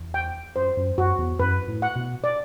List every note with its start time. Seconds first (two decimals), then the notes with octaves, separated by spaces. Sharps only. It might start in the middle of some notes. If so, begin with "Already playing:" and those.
Already playing: E2
0.14 G5
0.56 F#2 C5
0.77 F#2
0.98 F#2 F#4
1.19 E2
1.39 F#2 B4
1.68 A2
1.82 F#5
1.96 B2
2.24 D5